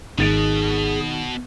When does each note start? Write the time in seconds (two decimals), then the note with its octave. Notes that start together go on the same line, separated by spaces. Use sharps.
0.18 G#1 B2 D#3 G#4 A6 D7